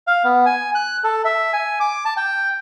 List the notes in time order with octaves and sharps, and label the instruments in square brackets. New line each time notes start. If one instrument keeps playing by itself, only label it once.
[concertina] F5
B3
G#5
F#6
A4
E5
G#5
D6
A5
G5